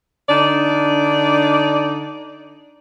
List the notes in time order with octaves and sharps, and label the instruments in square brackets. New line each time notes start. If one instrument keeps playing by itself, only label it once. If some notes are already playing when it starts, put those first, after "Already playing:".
[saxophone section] D3 D4 D#4 D5